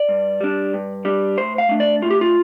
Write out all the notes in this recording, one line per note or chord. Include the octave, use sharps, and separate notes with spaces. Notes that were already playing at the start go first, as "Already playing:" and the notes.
Already playing: D5
G2
G3 D4
G2
G3 D4
A2 C5
F5
A3 D4
D5
A2 F4
G4
F4